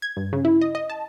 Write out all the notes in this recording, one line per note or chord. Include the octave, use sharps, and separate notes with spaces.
G#6
G2
C#3
E4
D#5
D#5
A5